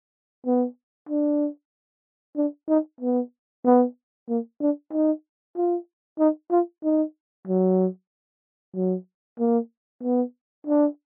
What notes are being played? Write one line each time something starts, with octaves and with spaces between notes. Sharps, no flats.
B3
D4
D4
D#4
B3
B3
A#3
D4
D#4
F4
D#4
F4
D#4
F#3
F#3
A#3
B3
D4